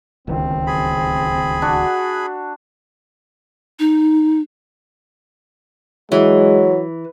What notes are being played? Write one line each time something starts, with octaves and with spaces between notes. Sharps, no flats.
D1 C#2 D#3 C4
G#4 B5
D4 F#4
D#4
E3 F#3 G#3